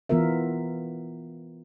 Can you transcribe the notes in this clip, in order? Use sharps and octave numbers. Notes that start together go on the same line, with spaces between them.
E3 B3 F4 A#4 E5